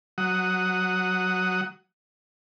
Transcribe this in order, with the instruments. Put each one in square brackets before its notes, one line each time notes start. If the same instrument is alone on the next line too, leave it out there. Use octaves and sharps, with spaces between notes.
[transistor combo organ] F#3 F#5 D#6